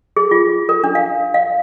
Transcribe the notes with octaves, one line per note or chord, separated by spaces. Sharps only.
G#4
F4
A#4
D4
F5
F5